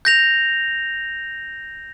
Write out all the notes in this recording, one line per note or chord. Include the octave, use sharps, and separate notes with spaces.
G6 A#6 F7